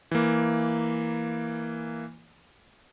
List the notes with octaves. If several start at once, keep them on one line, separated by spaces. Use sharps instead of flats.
E3 A#3